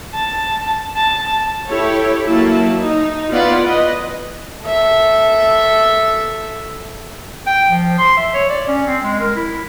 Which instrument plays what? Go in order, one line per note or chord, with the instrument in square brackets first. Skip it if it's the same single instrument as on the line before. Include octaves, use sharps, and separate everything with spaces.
[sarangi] A5
A5
[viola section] E4 G4 A4 C#5
F#3 A#3 E4 A5
D#4
B3 E4 F4 B4 D5 F#5
B4 D#5
[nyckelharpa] A4 E5
[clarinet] G5
F3
C6
E5
C#5
D5
C#4
C4
G#3
A#4
E4